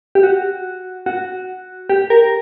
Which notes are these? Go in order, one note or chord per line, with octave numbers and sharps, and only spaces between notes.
G4
F#4
F#4
G4
A#4